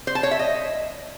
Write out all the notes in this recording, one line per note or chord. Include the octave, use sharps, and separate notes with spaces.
C5
A5
C#5
E5
D#5